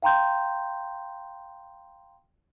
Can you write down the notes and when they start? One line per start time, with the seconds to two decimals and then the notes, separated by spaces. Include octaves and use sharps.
0.02 F5 G5 A#5 C6 G6